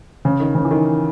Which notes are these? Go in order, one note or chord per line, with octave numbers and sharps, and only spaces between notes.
C#3
D#3
C#3
E3
D#3